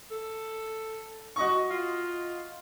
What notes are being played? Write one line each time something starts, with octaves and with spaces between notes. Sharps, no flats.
A4
F#4 D#5 C#6
F4